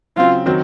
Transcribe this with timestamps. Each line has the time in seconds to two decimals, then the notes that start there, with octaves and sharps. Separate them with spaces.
0.16 C#3 F#3 C4 F4
0.46 D#3 F#3 C4 F#4